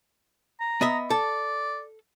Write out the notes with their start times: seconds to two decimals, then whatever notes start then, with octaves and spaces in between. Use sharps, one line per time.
0.60 A#5
0.81 B3 D#5 E5
1.10 A4 D5